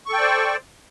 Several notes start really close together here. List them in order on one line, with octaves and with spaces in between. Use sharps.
C#6 A4 G5 D5 C5